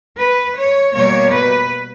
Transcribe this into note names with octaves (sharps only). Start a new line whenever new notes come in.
B4
C#5
B2 G3 A#3 C#5
B4